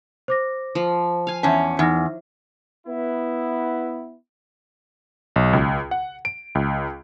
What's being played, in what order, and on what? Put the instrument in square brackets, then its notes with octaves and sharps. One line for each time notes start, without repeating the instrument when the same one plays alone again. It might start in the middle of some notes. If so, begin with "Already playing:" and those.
[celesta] C5 D6 A#6
[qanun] F3
F5 G#5
[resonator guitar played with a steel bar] E2 C#4 [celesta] E5 A5
[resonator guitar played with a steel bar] E2 [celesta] D#4 F6 A#6
[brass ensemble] B3 E4
[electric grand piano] B1
C#2
F#5
D7
C#2